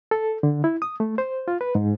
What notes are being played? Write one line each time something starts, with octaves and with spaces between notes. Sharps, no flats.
A4
D3
E4
D#6
A3
C5
F4
B4
G#2